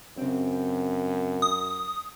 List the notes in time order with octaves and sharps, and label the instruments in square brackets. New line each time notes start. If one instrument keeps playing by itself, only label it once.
[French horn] F#2 [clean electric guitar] C#3 C4
[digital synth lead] D#6